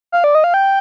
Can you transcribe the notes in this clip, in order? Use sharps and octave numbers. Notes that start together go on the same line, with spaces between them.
F5
D5
D#5
F5
G5